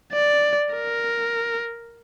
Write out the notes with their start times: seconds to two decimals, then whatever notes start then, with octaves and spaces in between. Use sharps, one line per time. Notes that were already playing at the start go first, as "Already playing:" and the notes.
0.13 D5
0.74 A#4